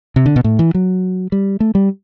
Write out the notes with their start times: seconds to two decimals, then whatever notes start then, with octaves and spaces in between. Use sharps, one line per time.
0.16 C3
0.26 D3
0.36 B2
0.44 A2
0.59 E3
0.74 F#3
1.32 G3
1.60 A3
1.75 G3